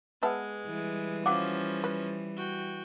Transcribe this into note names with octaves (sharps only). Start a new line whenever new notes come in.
G#3 B3 B4 E5 F#5 A5 E6
E3 G3
F3 F#3 C#4 F5 F#5 D6
B4
F#4 G5